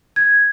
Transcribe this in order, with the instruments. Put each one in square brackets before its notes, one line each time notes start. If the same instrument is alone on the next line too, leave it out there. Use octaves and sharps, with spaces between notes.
[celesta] G#6